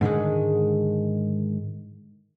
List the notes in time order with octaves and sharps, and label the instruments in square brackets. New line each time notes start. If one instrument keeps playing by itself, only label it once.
[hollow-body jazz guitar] G#2 D3 D#3 G#3